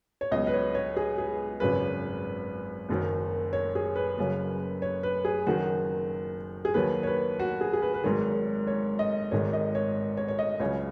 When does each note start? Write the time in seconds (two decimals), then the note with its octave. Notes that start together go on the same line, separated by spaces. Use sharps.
0.21 C#5
0.32 C#2 B2 F#3 D#5
0.47 B4
0.54 C#5
0.75 C#5
0.97 G#4
1.18 G#4
1.60 G#1 F#2 C#3 B4
2.89 F#1 F#2 D#3 F#3
3.53 C#5
3.75 G#4
3.96 B4
4.18 F#1 F#2 C#3 F#3
4.82 C#5
5.03 B4
5.25 G#4
5.47 F#1 F#2 D#3 F#3 F#4
6.65 G#4
6.74 D#2 D#3 F#3 B4
7.03 C#5
7.07 B4
7.40 F#4
7.61 G#4
7.73 G#4
7.82 B4
7.94 B4
8.03 G#1 G#2 D#3 F#3 C#5
8.67 C#5
8.99 D#5
9.31 G#1 G#2 D#3 C#5
9.53 D#5
9.75 C#5
10.17 C#5
10.28 C#5
10.39 D#5
10.60 C#2 C#3 F#3 C#5